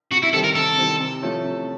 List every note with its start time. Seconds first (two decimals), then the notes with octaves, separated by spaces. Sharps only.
0.11 C3 F#4
0.22 E4
0.33 D#3 G3 C4 A4
0.44 A#4
0.55 C3 A4
0.78 D#3 G3 C4
1.00 C3
1.22 F3 A3 C#4
1.44 C3